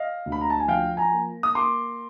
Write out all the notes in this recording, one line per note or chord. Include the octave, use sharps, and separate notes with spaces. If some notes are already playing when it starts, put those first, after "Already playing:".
Already playing: D#5 F5
D2
B5
A#5
A5
G#5
F3 F5 G5
G#5 A#5
A#3
D#6
A#3 C6 D6